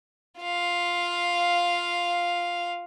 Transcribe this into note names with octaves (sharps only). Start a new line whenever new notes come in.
F4 F5